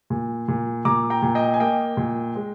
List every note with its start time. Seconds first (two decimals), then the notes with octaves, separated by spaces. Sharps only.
0.10 A#2
0.48 A#2
0.85 A#2 A#5 D6
1.10 G5 A#5
1.22 A#2
1.35 D#5 G5
1.54 G#5
1.60 A#3 D#5 G5
1.97 A#2
2.36 G#3